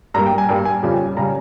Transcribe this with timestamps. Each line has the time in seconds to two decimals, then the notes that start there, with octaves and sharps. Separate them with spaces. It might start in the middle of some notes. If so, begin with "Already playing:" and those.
0.14 G2 G3 A#3 A#5
0.26 G5
0.38 G#5
0.49 G2 G3 A#3 G5
0.65 G#5
0.83 F2 C#3 G3
1.17 C#3 G3 A#5